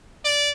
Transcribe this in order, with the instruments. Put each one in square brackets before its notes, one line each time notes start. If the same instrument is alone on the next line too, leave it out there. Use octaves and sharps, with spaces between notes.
[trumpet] D5